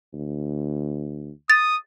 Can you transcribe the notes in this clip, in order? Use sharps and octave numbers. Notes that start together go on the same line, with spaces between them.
D2
D#6 A6